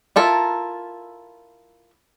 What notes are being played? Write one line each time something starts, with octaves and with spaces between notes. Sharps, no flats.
E4 F4 A4 A#4